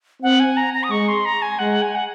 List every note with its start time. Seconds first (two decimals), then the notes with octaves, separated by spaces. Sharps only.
0.22 C4 F#5
0.40 G#5
0.57 A#5
0.74 A#5
0.84 D#6
0.90 G#3 C#6
1.08 C6
1.25 A#5
1.42 G#5
1.59 G#3 F#5
1.82 G#5
1.95 F#5